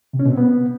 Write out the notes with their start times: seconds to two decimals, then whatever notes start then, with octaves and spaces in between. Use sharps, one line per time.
0.13 C3
0.19 C#4
0.25 B2
0.31 C4
0.37 B3